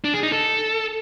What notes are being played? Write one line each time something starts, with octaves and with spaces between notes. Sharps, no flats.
D4
G#4
D#4
A4